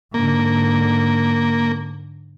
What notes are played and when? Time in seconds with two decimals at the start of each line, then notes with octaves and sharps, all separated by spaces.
0.14 G#2 D3 A#3